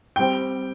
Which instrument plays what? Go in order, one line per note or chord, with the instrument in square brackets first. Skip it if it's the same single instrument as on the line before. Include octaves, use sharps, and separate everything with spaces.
[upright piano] G3 C4 G5